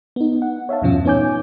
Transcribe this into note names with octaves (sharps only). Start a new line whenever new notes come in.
B3 D#4
F#5
C#5 E5 F5 A5
E2 G2 B2 F3 C#4
B3 D#4 C#5 G#5 D6 G6